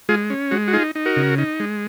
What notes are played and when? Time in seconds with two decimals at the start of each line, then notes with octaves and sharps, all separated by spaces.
0.09 G#3 F4 G#4
0.30 C#4
0.51 G#3 F#4
0.68 F#4
0.73 D#4 F4 G#4
0.95 D#4
1.06 F#4 A#4
1.17 C#3
1.38 D#4
1.60 G#3